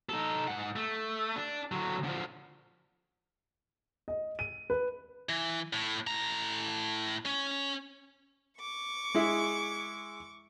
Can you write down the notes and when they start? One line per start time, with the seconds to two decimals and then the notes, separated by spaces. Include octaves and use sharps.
0.09 D#4 A4
0.48 G#2 F#5
0.76 A3
1.36 D4
1.72 D3 F#3
2.04 D3 F3
4.08 D#5
4.39 D#7
4.70 B4
5.29 E3
5.73 A2
6.07 A2 A#5
7.26 C#4
8.59 C#6 D6
9.15 G#3 E4 G#4